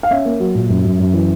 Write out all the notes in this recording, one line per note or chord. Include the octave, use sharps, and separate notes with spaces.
F5
C#4 E5
A#3
F#3
A#2
F#2
F#2
F#2
E3